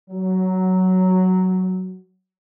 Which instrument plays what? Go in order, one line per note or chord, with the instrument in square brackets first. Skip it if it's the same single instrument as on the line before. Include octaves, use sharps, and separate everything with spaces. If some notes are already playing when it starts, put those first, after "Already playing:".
[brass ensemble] F#3